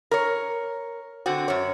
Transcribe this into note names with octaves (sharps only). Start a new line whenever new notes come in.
A#4 C#5
D3 C4 F#4
F#2 C#5